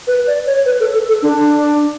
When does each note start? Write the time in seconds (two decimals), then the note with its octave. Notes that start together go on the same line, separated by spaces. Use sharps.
0.07 B4
0.27 D5
0.47 C#5
0.66 B4
0.80 A4
0.94 A4
1.08 A4
1.22 D4